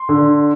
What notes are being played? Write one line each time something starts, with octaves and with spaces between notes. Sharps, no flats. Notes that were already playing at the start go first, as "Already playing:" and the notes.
Already playing: C6
D3